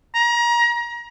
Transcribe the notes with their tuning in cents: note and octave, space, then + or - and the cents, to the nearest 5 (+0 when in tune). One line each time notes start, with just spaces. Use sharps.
A#5 +30